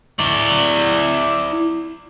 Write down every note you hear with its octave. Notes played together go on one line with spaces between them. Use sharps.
E4 D5